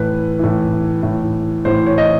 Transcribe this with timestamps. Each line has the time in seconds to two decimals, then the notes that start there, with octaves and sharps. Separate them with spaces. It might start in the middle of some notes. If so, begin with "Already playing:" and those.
Already playing: A2 E3 B4
0.39 A2 E3
1.03 A2 E3
1.65 A2 E3 C5
1.86 C#5
1.98 D#5